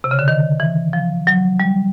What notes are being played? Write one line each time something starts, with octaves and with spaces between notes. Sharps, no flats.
C3
C#3
D3
D#3
E3
F3
F#3
G3